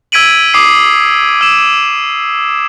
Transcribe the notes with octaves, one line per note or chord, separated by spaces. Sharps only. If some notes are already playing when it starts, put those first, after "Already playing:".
E6 G#6 B6 D7 D#7 F#7
D6 D#6 C7
E6 E7